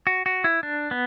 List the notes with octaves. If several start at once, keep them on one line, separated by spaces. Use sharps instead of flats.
F#4
F#4
E4
D4
B3